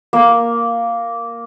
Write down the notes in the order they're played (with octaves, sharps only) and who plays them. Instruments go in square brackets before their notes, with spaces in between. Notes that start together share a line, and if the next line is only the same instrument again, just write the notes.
[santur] A#3